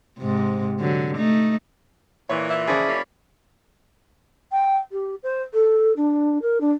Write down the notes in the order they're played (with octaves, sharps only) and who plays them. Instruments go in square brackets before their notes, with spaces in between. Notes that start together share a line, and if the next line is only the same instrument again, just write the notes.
[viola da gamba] G#2 C3
D3 F#3
A3 D#4
[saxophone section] A#2 E3 [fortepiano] C#5
[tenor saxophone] E4
[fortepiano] C#3 F3 G#4 [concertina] D5 B5
[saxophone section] F#3 A#3 C#4
[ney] G5
G4
C5
A4
D4
A#4
D4